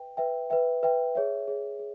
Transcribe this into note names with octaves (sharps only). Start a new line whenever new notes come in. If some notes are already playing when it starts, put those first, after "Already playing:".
Already playing: B4 E5 G5
B4 E5 G5
B4 E5 G5
B4 E5 G5
G#4 C#5 E5
G#4 C#5 E5
G#4